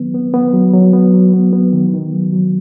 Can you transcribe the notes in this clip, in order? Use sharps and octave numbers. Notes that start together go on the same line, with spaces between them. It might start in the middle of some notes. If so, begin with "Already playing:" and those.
Already playing: D#3 F#3 B3
B3
B3
F#3
F#3
B3
F#3
B3
B3
D#3
D#3
F#3
F#3